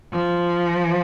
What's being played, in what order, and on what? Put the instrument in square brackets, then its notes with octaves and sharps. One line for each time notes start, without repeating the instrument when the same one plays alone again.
[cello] F3